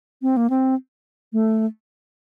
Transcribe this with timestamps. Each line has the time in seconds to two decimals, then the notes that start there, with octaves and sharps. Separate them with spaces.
0.22 C4
0.37 A#3
0.50 C4
1.33 A3